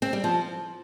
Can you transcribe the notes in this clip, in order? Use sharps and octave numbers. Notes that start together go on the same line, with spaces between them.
C4
G3
F3